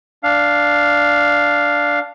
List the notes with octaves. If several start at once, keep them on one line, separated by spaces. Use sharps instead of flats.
D4 F5